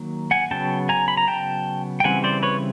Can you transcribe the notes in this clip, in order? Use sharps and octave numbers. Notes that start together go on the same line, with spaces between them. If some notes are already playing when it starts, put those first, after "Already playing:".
Already playing: D#3 F#3 A#3
F#5 G#5
C#3 F#3 B3 G5 A5
G#5 A#5
B5
A#5
G5 A5
G5
C#3 E3 G3 C4 F#5 G#5
C5 D5
B4 C#5